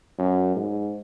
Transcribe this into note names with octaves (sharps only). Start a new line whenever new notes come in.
F#2
G#2